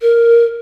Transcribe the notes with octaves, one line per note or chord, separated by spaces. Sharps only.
A#4